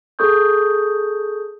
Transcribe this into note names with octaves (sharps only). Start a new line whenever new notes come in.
G#4 A4 C#6 D#6 G6